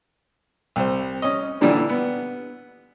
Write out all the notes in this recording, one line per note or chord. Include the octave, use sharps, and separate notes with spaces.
C2 C5
C#4 D#5
A#2 D3 E3 G3
B3